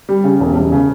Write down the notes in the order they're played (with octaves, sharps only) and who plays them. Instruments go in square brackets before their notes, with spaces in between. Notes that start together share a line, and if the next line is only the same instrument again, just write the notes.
[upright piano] G3
C#3
E1
E1
C#3